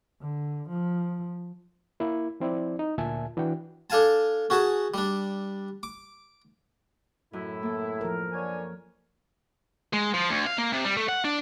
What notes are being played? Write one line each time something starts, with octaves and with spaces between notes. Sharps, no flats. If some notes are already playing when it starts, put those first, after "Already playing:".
D3
F3
A#3 E4
F3 C4 E4 D5
D#4
D2 A#2 E5 G#5 A5
E3 D4 F#4 G5
D4 A4 F5 G#5 A5
C#4 F#4 G#4 A5
G3 D4
D6
F#2 A2 E4
A#3 A4
F3 A#4
D3 C#5 G#5
G#3
F3
D2
F5
A#3
C3
G3
A3
F#5
D4